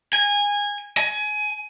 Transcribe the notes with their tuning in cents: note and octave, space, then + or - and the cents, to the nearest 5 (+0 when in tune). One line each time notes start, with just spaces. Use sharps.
G#5 -20
G#5 +20